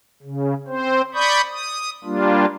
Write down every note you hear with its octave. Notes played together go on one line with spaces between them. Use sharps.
C#3
C4 C5
D5 B5 C#6 D#6 G6
D#6
G3 A#3 D4 F4